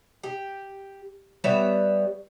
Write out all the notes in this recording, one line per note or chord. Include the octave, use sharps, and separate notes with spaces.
G4
G3 B3 C#5 E5